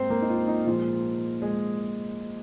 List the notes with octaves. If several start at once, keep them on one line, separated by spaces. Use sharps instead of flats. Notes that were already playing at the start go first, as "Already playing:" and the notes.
Already playing: G#2 G#3 A#3 C4 C5
A#3 A#4
D#4
F4
D#4
A#2 F3 G#3 F4
G#3 G#4